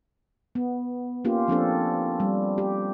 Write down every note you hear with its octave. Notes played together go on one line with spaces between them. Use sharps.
B3
A#3 C#4 F4 G4
F3 C4 D4 A4
G3
G4